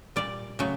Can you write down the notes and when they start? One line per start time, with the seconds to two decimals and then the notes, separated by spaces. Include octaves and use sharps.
0.16 A#2 G3 D5
0.59 C#3 F#3 A3